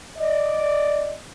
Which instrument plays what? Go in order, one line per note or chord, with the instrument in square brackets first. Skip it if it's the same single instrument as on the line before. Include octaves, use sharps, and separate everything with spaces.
[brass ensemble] D5 D#5